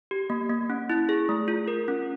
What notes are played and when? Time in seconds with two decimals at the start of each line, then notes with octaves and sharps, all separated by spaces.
0.11 G4
0.30 A#3
0.50 A#3
0.70 C#4
0.90 E4
1.09 G#4
1.29 A3
1.48 F4
1.68 A#4
1.88 C#4